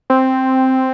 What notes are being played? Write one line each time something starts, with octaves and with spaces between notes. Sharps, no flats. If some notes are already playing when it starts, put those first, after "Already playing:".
C4